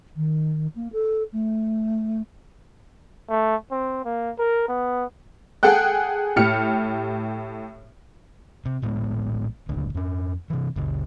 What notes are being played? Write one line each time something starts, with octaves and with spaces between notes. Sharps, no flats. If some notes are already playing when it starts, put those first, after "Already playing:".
D#3
A#3
A4
A3
A3
C4
A#3
A#4
B3
G#4 A4 F#5 G5 F#6
A2 G4 F6 C#7
C3
A#1 A2 G#3 B3
D#1 C#2 D3
F2 C#4
C3 E3
F#1 C#2